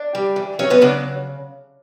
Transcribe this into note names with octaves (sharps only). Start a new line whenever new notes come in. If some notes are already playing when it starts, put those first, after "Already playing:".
Already playing: D4 D5
G3
E3
F#3 C#4 C#5
B3 B4
C#3 D4 D5